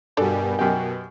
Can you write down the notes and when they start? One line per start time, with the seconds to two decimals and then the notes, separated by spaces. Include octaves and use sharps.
0.17 G2 B2 G3 D4 A4 A#4 D5 G#5
0.59 F#2 B2 G4